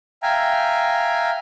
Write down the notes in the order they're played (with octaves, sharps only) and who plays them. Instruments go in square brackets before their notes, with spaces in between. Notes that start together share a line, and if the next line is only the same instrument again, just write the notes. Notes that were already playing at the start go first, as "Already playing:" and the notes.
[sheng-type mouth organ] E5 F5 G5 G#5 A#5